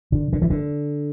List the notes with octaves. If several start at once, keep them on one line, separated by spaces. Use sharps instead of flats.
D3
D3
E3
D3